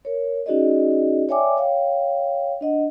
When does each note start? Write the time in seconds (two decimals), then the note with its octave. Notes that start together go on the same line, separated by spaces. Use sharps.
0.05 A#4 C#5
0.46 C#4 D#4 F#4 G#4 D5 D#5
1.29 C#5 D5 E5 G5 G#5 D6
1.57 C#5 F5 G5
2.61 D4 D#5 F#5